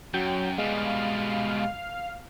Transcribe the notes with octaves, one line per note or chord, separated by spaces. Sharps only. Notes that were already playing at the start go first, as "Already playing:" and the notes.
F#2 F#3 G5
B2 G3 G#3 F5